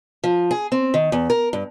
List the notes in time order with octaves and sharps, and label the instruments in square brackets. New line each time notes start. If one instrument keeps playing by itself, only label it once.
[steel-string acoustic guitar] F3
G#4
C4
D#3
E2
A#4
G2